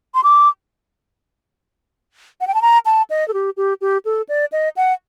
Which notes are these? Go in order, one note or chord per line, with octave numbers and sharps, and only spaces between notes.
C6
D6
F#5
G5
A5
A#5
A5
D#5
A4
G4
G4
G4
A4
D5
D#5
F#5